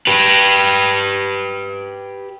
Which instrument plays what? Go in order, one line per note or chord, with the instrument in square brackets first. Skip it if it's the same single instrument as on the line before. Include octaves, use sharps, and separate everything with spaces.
[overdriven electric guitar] G4 B4